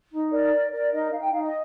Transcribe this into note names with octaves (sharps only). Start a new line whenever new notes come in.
D#4
A#4 D5
A#4
A#4 D5
D#4 D#5
D#4 F5
G5
D#4 F5
D#5